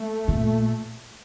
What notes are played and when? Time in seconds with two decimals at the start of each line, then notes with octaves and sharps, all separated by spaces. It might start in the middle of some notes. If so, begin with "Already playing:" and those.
Already playing: A3
0.28 A#2